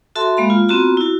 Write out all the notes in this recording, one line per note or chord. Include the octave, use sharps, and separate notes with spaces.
F#4 A4 E5 A5 C6
G#3 A#3 F5 B5
F4
B3 C4 F4 F#4 A#5
E4 F#4